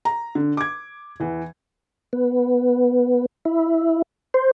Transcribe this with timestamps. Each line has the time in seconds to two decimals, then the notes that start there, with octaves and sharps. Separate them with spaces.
0.05 A#5
0.35 D3
0.57 D6 G#6
1.20 E2 E3
2.13 B3
3.45 E4
4.34 C5